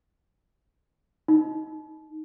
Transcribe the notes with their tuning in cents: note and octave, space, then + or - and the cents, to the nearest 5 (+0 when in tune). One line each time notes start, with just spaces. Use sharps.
D#4 +5